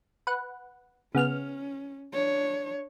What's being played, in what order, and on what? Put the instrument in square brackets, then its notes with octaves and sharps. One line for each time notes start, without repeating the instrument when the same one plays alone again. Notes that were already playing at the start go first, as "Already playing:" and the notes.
[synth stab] B4 F#5
[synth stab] C#3 B3 F6 [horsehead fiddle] C#4
[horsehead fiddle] D4 C#5